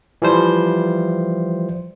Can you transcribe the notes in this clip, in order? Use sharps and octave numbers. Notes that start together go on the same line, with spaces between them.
E3 F3 G3 C5